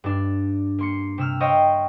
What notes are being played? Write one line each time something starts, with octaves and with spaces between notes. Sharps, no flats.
G2 D4
A#3 C6 C#7
C3 E6 F6
C5 C#5 D#5 F5 G5